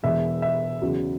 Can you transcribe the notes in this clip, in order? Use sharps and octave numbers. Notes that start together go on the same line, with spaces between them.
E1 E2 E3 E5
E5
E2 C#3 F#3